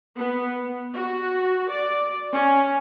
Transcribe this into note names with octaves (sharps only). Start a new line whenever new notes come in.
B3
F#4
D5
C#4